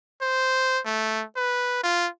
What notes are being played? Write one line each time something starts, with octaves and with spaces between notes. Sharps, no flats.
C5
A3
B4
F4